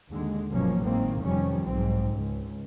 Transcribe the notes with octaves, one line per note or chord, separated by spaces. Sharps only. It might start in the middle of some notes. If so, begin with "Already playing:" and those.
D#2 D3 G#3
G1 B2 F3 F#3 A#3 C#4
G#1 A2 D#3 A#3 C4
F1 F2 D#3 F3 G3 C#4
B1 G#2 C4
C#2